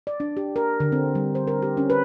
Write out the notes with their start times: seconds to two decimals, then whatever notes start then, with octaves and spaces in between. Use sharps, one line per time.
0.07 D5
0.20 D4
0.37 G4
0.56 A#4
0.80 D3
0.92 C4
1.15 G3
1.35 C5
1.47 A#4
1.62 G4
1.77 C#4
1.90 B4